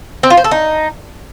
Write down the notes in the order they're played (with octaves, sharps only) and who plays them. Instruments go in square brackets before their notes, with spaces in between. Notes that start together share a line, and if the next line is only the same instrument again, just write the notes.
[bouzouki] C4
F4
C5
A4
D#4